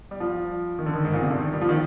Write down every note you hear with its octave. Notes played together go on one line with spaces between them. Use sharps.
G3
F3
D#3
D3
D#3
G#2
A#2
C3
D3
D#3
G3
F3
D#3